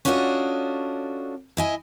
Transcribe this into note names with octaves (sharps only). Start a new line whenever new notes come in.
C#4 D4 F4 F#4 A4 D#5
E4 D#5 G#5